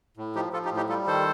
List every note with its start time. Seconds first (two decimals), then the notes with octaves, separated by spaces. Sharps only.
0.17 A2
0.35 F3 D#4 G4
0.53 F3 F4 A4
0.65 D#4 G4
0.71 A2
0.77 D#4 G4
0.89 G3 F4 A4
1.07 D#3 A4 C5